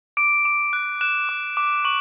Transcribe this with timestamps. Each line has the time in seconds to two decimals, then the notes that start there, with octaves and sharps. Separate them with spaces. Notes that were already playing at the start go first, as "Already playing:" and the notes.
0.17 D6 D7
0.45 D6
0.73 F#6
1.01 F#6 E7
1.29 D6
1.57 D6
1.85 C#6 F#7